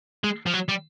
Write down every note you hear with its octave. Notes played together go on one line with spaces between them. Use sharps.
G#3
F3
F#3
G3